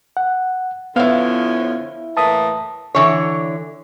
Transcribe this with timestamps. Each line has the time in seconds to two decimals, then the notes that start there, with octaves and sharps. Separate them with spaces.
0.17 F#5
0.96 D3 F3 B3 C#4 E4 F5
2.17 A2 E3 A#3 A5 D#6
2.95 D3 E3 C#5